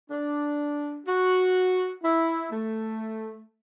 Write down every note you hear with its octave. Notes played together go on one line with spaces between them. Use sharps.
D4
F#4
E4
A3